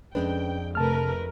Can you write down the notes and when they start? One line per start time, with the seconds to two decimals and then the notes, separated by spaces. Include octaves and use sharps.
0.15 F2 G#3 C#4 D4 B4 G5
0.75 C3 A3 A#4 B4 A5 F6